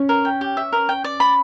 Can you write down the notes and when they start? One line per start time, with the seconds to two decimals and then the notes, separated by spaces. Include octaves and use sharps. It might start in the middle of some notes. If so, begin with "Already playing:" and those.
Already playing: C#4
0.09 A#4
0.25 G5
0.41 G4
0.57 E5
0.73 A#4
0.89 G5
1.04 D5
1.20 B5